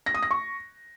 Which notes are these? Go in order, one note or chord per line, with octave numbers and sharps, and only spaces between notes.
A#6
D#6
A#6
C#6